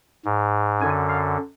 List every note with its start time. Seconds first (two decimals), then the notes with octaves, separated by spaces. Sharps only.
0.25 G#2
0.81 F#2 D3 G#5
1.09 F5